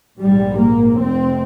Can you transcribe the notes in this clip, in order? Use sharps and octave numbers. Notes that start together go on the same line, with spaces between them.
A#1 G#2 G3
A#3
F1 F2 C3 C4